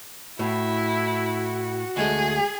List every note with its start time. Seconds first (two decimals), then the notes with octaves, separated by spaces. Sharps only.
0.39 A2 E4 F#4
1.97 D2 G#3 A3 G#4